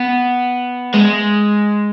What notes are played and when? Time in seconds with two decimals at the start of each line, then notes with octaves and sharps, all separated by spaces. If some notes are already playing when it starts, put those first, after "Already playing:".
Already playing: B3
0.94 G#3